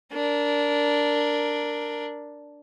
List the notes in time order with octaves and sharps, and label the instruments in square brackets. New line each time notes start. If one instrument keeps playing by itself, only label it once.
[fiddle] D4 A#4